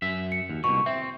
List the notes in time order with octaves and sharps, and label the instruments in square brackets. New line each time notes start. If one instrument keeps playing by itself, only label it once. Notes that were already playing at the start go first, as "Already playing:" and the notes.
[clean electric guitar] F#2 E5
[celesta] C#7
[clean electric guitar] D#2
[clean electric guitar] C2 F#2 B2 [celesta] C#6
[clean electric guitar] C4 [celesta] E5